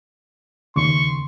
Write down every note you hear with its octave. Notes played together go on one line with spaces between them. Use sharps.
D#2 C#3 C6 C#6